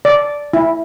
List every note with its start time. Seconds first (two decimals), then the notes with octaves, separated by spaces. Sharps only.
0.05 D5
0.53 E4